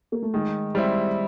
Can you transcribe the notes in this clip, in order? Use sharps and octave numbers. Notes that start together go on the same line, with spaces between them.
A#3
A3
D#3 G#3
G3 G#3 C4 E4